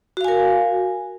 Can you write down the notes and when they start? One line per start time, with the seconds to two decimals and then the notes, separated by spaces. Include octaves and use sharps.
0.17 F#4
0.21 F5
0.24 G#5
0.28 A#4